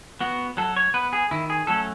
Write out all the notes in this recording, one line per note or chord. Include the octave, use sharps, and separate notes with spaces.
B3 F#4
F#3 A4
C#5
B3 B4
G#4
D#3 E4
G#4
F#3 A3 C#4 A4